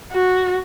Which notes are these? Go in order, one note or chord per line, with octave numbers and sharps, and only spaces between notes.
F#4